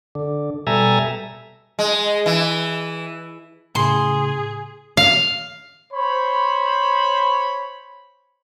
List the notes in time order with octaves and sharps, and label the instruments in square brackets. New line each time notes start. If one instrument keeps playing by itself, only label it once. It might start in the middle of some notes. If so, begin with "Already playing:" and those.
[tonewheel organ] D3
B2 G3 A4 E5 G#5 A#5
[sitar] G#3
E3
[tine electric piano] A2 C#3 [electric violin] G#4 [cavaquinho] C6
[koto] F5
[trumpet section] C5 C#5 B5